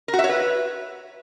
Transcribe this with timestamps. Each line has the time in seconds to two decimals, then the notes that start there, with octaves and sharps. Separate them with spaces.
0.08 A#4
0.13 F#4
0.19 E5
0.24 C#5
0.29 B4